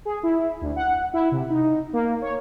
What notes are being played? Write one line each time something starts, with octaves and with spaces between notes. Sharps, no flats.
G#4
E4
D2
F#5
E4
C3
D#4
A#3
C#5